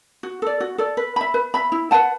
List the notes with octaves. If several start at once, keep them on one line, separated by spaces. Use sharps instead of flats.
F#4
A4 D5
F#4
A4 D5
B4
E5 B5
B4
E5 B5
E4
B4 F#5 A5